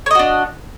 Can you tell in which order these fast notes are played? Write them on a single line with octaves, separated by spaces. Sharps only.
C#5 D#5 F#4 D4